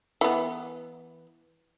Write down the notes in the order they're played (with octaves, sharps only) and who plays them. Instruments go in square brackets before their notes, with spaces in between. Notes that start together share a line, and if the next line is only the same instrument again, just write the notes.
[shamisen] E3 B3